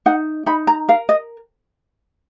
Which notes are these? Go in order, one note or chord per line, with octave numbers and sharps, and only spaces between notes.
D#4 F#5
D#4 B5
A#5
A#4 F5
D#5